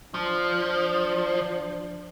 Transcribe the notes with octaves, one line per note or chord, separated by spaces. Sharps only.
F3 D4